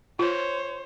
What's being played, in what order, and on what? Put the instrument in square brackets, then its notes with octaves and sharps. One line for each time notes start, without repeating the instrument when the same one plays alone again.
[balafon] F4 [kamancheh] C5 C#5